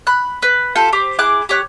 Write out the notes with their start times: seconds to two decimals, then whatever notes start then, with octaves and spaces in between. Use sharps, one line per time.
0.07 B5 F#6
0.42 B4
0.75 F4 G4 A4
0.93 G4 C5 D6
1.19 E4 G#4 D6 F#6
1.49 G4 C#5 F#6